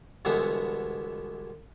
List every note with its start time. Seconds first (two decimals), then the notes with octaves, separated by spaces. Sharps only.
0.25 C2 B2 D3 E3 G#3 B3